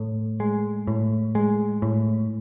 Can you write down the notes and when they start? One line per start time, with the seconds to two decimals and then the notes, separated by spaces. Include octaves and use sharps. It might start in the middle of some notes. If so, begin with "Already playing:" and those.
Already playing: A2
0.40 G#3
0.87 A2
1.35 G#3
1.82 A2